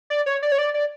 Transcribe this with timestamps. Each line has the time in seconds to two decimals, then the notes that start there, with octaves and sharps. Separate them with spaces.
0.10 D5
0.26 C#5
0.42 D5
0.52 C#5
0.58 D5
0.74 D5